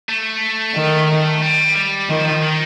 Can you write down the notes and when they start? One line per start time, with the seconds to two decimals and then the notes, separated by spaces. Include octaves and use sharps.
0.09 A3
0.76 D#3
1.42 G3
1.76 G3
2.09 D#3 F3
2.43 D#3